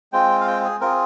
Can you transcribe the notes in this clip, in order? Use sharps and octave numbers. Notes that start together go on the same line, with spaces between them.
G#3 C4 F4 G5
F5
G5
G#4
C4 F4 G#4 A#4